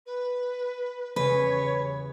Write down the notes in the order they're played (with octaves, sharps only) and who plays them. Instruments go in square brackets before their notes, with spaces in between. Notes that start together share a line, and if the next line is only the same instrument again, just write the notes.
[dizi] B4
[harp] E2 C#3 G3 [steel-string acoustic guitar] B4 [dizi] C#5